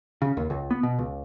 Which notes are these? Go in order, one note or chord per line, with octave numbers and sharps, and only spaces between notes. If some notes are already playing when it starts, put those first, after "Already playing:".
C#3
D#2
C#2
B3
B2
C#2